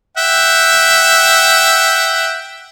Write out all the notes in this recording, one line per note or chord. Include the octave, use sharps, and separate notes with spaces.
E5 F#5 G5